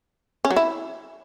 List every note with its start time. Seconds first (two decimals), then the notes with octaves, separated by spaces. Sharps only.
0.45 C#4
0.51 F#3
0.56 E4